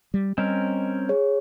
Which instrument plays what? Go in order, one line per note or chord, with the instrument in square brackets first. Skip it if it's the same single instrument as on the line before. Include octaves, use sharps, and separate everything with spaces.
[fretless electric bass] G3
[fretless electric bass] G3 [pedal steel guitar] C4 C#4 A#4 [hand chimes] D#5
[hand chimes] G#4 C#5